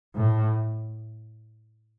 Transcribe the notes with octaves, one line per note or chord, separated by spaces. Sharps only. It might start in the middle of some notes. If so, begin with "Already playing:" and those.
A2